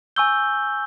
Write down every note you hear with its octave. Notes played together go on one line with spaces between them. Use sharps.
G#5 C#6 E6 G6 G7